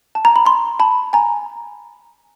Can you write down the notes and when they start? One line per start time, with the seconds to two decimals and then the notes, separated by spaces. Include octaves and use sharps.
0.15 A5
0.25 A#5
0.36 B5
0.45 A#5 C6
0.80 A5 B5
1.13 G#5 A#5